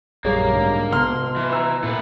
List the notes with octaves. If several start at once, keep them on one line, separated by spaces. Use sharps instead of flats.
A#1 F#2 G3 A#3 G#4 C#5
B1 G#2 D3
C3 B3 C6 F6
E3
A#5 E6
A#2 A3 B4